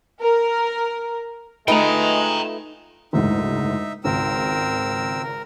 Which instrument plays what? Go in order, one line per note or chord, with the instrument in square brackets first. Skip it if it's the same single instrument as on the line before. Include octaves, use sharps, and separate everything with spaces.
[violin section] A#4
[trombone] G#3 [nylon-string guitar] A3 F4 B4 [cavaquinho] D#4 [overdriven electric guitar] G5 A#5
[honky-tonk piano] F#1 D2 G#2 [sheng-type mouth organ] D#4 E5
[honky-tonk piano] G#1 C#2 [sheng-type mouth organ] C4 A#4 E6
[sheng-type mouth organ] A#4